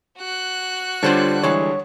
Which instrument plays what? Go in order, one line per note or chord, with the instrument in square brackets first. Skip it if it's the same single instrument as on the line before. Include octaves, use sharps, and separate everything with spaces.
[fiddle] F#4 F#6
[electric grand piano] D3 G3 D4 [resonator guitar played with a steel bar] F4 C5 C#5
[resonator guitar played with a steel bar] E3 G#3 [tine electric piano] C#5